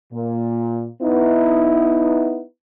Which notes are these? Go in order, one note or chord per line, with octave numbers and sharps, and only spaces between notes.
A#2
B3 D#4 E4